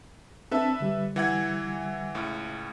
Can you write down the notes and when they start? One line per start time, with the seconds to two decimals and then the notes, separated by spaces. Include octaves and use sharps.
0.51 C4 D4 A4 B4 E5 A5
0.80 D3 G3
1.16 E3 F#5 G#6
2.15 C#2 A2